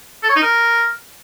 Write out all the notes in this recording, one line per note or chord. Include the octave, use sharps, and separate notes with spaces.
A4
C#5
D#4
A#4